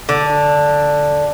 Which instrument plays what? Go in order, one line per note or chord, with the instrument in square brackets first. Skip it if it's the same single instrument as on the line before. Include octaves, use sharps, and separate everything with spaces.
[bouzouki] D3